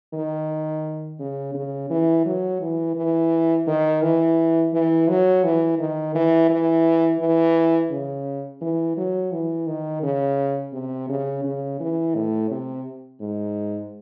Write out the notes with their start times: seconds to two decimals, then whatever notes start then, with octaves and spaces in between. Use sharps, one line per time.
0.14 D#3
1.19 C#3
1.54 C#3
1.90 E3
2.25 F#3
2.61 E3
2.96 E3
3.67 D#3
4.02 E3
4.73 E3
5.09 F#3
5.44 E3
5.79 D#3
6.15 E3
6.50 E3
7.20 E3
7.91 C#3
8.61 E3
8.97 F#3
9.32 E3
9.67 D#3
10.03 C#3
10.73 C3
11.09 C#3
11.44 C#3
11.80 E3
12.15 A2
12.51 C3
13.21 G#2